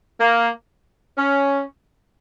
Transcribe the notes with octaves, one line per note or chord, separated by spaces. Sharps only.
A#3
C#4